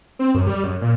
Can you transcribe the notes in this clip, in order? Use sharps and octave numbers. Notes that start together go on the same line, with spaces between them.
C4
F#2
G3
F#2
A#2